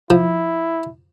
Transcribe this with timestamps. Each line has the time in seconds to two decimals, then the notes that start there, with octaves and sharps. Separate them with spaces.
0.10 F3 E4